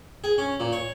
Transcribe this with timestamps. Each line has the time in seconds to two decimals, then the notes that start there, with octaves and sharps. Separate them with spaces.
0.24 G#4
0.38 C#4
0.60 A#2
0.72 C#5